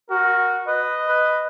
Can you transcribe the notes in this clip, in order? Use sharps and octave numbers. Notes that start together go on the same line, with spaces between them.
F#4 A#4
B4 D#5
B4